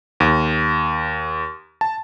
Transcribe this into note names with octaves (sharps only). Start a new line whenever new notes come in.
D#2
A5